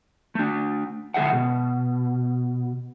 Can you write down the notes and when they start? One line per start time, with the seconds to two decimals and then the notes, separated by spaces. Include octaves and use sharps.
0.35 A3 D4
1.14 D3 G#3 G#4 E5 F#5
1.33 B2